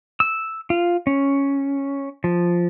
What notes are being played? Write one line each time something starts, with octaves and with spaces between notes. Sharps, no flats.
E6
F4
C#4
F3